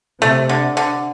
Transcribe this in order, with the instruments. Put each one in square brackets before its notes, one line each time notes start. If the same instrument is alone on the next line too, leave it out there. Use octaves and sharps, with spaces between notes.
[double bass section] C3 [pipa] A3
[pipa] D3
D3